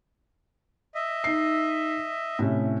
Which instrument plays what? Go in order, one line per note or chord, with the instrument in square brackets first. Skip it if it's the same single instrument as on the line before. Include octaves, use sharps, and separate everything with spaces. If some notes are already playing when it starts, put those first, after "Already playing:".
[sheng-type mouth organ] D#5 E5
[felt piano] D#4 C7
A2 C3 C#4